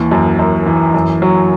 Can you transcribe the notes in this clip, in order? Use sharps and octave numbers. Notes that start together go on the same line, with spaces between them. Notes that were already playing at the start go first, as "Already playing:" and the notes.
Already playing: D#2 E3
F#2
F#2
E3
F#2
F#3